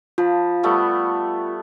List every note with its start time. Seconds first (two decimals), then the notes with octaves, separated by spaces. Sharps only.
0.18 F3 F4
0.63 G3 A3 B3